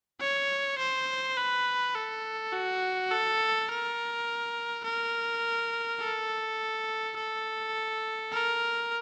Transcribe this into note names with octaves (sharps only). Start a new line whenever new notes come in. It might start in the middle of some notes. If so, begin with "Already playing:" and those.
C#5
C5
B4
A4
F#4
A4
A#4
A#4
A4
A4
A#4